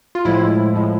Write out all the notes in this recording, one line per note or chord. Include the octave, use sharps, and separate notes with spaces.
F4
A2 F3 G#3 E4
A2 F3 G#3